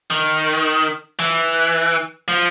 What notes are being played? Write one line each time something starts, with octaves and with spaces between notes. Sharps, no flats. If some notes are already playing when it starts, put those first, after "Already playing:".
D#3
E3
F3